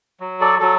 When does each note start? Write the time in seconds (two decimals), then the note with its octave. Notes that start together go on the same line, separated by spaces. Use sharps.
0.20 F#3
0.41 A4 D5
0.60 F#3 A4